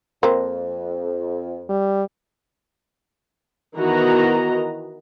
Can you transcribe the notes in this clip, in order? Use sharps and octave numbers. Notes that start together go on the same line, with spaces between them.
F2 A#3 C4
G3
D#3 E3 B3 F#4 D#5 A#5